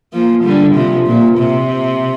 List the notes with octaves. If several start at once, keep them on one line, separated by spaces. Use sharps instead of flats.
F3 A#3
D3 G3
C3 F3
A#2
C3